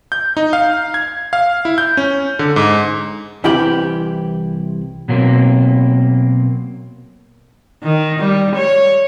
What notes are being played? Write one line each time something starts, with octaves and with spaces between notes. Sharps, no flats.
G6
D#4
F5
G#6
F5
E4
G6
C#4
D3
G#2
C2 C3 E3 E4 G4 B5
B2 F#3 A#3 C4
D#3
G3
C#5